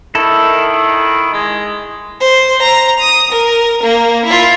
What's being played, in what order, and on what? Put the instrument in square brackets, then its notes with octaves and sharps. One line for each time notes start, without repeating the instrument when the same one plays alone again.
[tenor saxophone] D#3 [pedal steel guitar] E4 A4
[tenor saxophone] G#3
[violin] C5
A#5
D#6
A#4
A#3
E4 F4